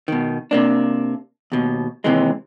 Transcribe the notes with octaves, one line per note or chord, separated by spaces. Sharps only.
B2 D#3
C3 A#3 D4
D#2 B2
D#2 C3 E3 G#3